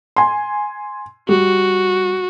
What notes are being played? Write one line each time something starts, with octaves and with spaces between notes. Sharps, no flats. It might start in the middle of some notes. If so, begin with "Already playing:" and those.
G#5 C6
G3 F#4